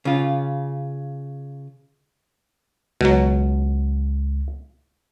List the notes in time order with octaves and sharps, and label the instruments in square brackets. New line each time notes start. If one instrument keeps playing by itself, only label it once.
[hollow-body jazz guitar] C#3 F4
[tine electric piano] C#2 [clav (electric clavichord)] B2 F#3